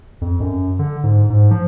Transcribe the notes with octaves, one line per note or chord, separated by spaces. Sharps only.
F2
F#2
D3
G#2
G#2
F3